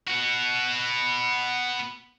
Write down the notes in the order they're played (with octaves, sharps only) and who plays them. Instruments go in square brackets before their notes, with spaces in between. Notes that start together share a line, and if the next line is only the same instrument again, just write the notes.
[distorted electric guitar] B3 F#4